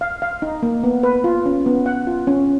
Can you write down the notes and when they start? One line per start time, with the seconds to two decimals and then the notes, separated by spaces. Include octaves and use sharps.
0.01 F5
0.22 F5
0.42 D#4
0.63 A#3
0.83 B3
1.03 B4
1.24 F4
1.46 C#4
1.66 B3
1.86 F#5
2.07 F4
2.27 C#4